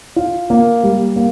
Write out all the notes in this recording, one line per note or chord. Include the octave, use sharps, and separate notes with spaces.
F4
A#3
G3
A#3